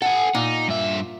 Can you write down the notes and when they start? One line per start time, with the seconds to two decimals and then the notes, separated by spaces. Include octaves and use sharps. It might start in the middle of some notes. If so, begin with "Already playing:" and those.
0.02 A4 F#5 G#5
0.35 A#2 D#4
0.68 G2 E5